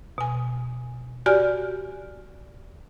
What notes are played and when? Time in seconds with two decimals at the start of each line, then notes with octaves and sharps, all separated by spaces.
0.18 B2 G#5
1.26 F#4 G4 D5 G#5 F6